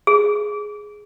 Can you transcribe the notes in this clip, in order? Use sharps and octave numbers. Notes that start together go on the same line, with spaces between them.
G#4